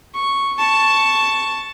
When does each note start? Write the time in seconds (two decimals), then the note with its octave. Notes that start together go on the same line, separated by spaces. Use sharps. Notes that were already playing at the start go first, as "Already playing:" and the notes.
0.15 C#6
0.59 A5 C#6